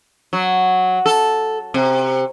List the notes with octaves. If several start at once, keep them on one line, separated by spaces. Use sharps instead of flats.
F#3
A4
C3